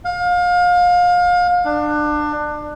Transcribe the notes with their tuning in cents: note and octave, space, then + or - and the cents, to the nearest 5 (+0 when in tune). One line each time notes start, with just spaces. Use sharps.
F5 +30
D4 +25